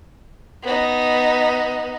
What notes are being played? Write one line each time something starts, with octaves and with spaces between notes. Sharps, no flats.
B3 D#4